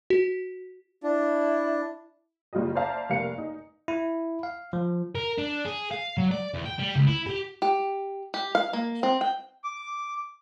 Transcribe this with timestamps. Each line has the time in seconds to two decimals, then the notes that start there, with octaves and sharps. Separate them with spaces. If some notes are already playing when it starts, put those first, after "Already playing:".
0.10 F#4
1.03 D4 E4
2.53 F#1 G3 F4 F#4 D#5
2.75 C5 D5 E5 F5 A5 A#5
3.09 F1 G3 A#3 F5 C#7
3.38 D#4
3.88 E4
4.43 F5
4.73 F3
5.15 A#4
5.38 D4
5.65 G#4
5.91 F5
6.17 F#3
6.31 D5
6.54 E2
6.65 G5
6.79 G3
6.96 C#2
7.07 E4
7.27 G4
7.62 G4
8.34 G4
8.55 F5
8.73 A#3
9.03 C4
9.21 G5
9.64 D6